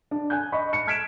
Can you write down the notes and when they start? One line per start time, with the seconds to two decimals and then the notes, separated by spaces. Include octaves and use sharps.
0.11 D4
0.30 G#5 F#6 G6
0.52 D#5 B5 C#6
0.73 C#7
0.87 F6 G#6 B6 C#7 D7 E7